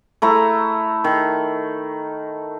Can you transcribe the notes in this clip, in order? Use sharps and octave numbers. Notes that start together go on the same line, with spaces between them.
A3 E4 A#5
D#3